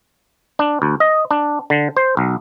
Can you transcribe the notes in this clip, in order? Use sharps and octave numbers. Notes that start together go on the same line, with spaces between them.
D4
D2
D#5
D4
D3
C5
B1